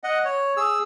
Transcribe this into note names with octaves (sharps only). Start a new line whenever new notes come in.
D#5 F#5
C#5
G#4 E6